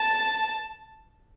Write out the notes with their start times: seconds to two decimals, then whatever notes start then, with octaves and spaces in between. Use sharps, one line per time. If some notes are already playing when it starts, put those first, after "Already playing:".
Already playing: A5